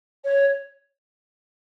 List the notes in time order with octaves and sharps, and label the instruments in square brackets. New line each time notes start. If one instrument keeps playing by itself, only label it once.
[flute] C#5